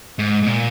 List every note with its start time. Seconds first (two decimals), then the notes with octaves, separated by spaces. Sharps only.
0.19 G#2
0.43 G#2
0.46 A#2